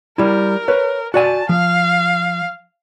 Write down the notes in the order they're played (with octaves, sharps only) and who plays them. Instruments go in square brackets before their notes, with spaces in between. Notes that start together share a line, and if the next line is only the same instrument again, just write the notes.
[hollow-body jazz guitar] G3 E4 [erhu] A#4
[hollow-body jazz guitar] B4 C#5
[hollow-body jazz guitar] F#4 D5 G#5 [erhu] A5
[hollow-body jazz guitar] F3 [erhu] F5